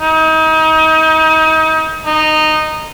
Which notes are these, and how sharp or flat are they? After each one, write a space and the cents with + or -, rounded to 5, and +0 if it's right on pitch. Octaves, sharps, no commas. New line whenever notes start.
D#4 +35
D#4 -10